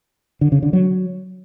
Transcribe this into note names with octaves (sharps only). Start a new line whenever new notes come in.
D3
C#3
D3
F#3